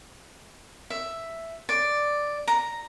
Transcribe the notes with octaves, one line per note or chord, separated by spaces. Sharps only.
E5
D5
A#5